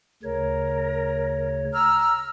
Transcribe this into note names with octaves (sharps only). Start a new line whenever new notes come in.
D2 C#3 A#4 C#5
A#5 E6 F6